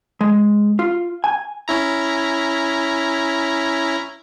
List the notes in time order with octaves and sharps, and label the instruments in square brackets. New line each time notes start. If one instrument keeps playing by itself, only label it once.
[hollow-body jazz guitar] G#3
F4
G#5
[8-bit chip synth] C#4 E4 A#5